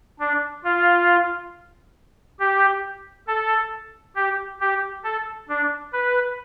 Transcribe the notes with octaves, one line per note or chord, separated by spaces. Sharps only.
D4
F4
G4
A4
G4
G4
A4
D4
B4